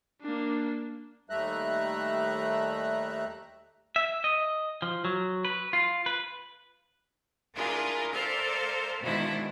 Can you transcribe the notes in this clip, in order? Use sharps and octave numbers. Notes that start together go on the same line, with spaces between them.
A#3 D4
D#2 G3 A3 E5 A#5 F#6
E5
D#5
F3
F#3
B4
F4
B4
D4 E4 F4 G#4 A#4
A4 A#4 C5 D5 E5 F5
B2 D#3 F3 G#3 D4 E4